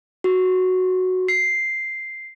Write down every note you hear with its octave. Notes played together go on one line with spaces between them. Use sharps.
F#4
C7